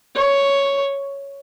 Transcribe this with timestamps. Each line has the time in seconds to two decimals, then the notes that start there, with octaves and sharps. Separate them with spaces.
0.16 C#5